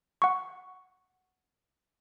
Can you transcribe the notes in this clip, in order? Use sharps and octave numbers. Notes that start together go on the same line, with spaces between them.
F#5 C#6